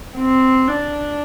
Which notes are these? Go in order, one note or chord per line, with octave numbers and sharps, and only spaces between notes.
C4
D4